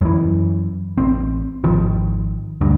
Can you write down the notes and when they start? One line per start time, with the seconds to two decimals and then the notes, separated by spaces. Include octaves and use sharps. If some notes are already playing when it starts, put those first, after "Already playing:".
0.01 F#2 E3
0.98 A1 C4
1.64 G#1 D#3 F3
2.61 D2 G2